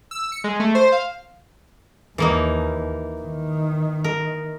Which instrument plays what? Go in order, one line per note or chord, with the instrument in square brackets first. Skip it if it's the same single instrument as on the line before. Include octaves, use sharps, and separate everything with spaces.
[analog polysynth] E6
C#7
G#3
A3
C5
F5
[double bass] D#2 [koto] E3 A#3 D#4
[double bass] D#3
[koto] A#4